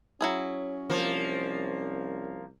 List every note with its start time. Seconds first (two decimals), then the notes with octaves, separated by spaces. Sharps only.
0.21 F#3 C#4 E4 G#4
0.90 C2 F3 A#3